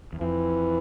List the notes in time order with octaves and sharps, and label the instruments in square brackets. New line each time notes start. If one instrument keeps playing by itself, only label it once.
[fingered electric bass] E2
[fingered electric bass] F2 [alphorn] E3